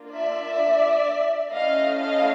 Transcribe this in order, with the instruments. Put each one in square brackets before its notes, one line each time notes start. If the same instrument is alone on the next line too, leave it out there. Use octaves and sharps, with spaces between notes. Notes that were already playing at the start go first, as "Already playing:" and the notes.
Already playing: [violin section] A#3 D4 F4
D5 E5
A3 C#4 E4 A4 D#5 F5
D#5 F5